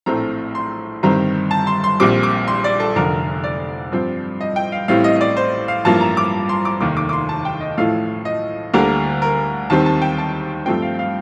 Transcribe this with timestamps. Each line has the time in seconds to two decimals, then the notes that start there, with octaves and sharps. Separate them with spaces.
0.06 A#1 A2 A3 C4 A#5
0.55 C6
1.03 G1 G2 D#3 G3 C4 A#5
1.51 A5
1.67 C6
1.84 C6
2.00 A#1 A#2 G3 C4 D6
2.23 D6
2.48 C6
2.64 D5
2.80 A4
2.96 F1 F2 D3 A#4
3.44 D5
3.92 G2 F3 C4
4.41 D#5
4.56 G5
4.72 F5
4.88 A1 A2 G3 C4 F5
5.04 D#5
5.16 D#5
5.21 D5
5.37 C5
5.68 F5
5.85 A1 G2 F3 A#3 A5
6.01 A#5
6.17 D6
6.49 C6
6.65 D6
6.81 F1 D#2 D#3 A#3 D6
6.97 D6
7.09 D6
7.13 C6
7.29 A5
7.45 G5
7.61 D#5
7.77 A1 A2 F3 A3 F5
8.25 D#5
8.73 D2 D3 G3 A#3 A#4
9.22 A#4
9.70 D#2 D#3 G3 C4 A5
9.86 A5
10.02 G5
10.18 A5
10.66 G2 F3 A3 C4 G5
10.82 F5
10.99 F5